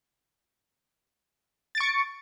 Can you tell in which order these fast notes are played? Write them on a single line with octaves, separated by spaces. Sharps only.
A6 D7 C#6 C#7